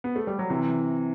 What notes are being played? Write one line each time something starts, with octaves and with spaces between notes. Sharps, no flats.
B3
A3
G3
F#3
C3 E3